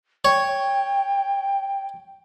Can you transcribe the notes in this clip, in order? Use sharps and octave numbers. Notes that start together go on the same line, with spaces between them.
C#5 G5